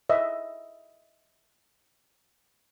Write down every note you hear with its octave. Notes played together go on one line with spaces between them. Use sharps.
D#5 E5